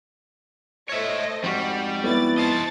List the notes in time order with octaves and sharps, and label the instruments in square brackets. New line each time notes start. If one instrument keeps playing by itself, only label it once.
[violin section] A3 C5 D#5 [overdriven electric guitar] C#5 E5
[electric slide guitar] F2 G#2 F#4 [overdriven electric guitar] G3
[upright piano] B3 E4 [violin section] D5 A6
[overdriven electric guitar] C5 D#5 [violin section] A5 A6